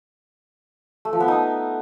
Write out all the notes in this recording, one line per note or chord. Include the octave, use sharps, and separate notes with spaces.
A3
F3
B3
D#4